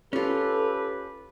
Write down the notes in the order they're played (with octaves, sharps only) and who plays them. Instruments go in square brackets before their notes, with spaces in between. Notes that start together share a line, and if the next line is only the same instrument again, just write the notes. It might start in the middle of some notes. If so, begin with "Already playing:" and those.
[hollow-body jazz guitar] C#4 F4 [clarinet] G4 [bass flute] A4 [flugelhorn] B4